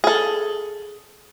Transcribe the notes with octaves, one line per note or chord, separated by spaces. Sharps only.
G#4 A4